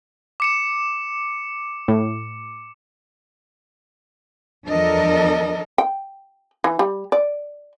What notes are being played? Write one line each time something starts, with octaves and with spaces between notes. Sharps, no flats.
D6 C#7 E7
A2
E2 F3 D4 A4 A#4 D#5
G5
E3
G3
D5